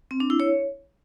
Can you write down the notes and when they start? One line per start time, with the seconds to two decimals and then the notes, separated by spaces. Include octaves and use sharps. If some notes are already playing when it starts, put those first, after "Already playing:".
0.11 C4
0.20 D4
0.30 E4
0.40 C#5